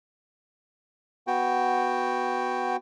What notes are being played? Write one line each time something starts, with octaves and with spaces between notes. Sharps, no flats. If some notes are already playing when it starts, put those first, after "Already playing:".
B3 F#4 G5